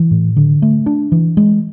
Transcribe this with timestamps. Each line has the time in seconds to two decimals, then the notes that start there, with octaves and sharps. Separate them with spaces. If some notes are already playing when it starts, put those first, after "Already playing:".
Already playing: E3
0.11 A2
0.36 D3
0.62 A3
0.86 D4
1.12 E3
1.37 G#3